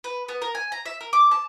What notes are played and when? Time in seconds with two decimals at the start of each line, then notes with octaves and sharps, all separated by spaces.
0.04 B4
0.28 B3
0.42 A#4
0.55 G#5
0.72 A#5
0.85 E5
1.01 A#4
1.13 D6
1.31 A5